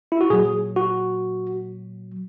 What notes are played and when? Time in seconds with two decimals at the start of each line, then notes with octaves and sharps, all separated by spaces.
0.12 E4
0.21 F#4
0.30 A#2 F#3 G#4
0.76 F#4